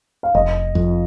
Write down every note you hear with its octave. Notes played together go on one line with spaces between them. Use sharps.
F5
F1 D#5
F2